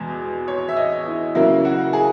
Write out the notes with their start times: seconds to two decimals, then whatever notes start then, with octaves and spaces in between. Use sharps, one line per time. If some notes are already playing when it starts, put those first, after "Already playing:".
Already playing: E2 B2 G#3
0.48 C#5
0.69 E5
0.77 D#5
1.06 E4
1.35 C#3 F#3 A#3 E4
1.65 F#4
1.93 G#4